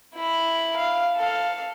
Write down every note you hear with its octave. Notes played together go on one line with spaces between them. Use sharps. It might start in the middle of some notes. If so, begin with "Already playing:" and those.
E4 B5
F5
A4 F5